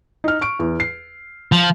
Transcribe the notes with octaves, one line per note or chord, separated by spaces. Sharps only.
D#4 F6
C#6 D7
E2
C7
F3